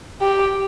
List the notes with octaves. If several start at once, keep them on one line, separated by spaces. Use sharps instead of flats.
G4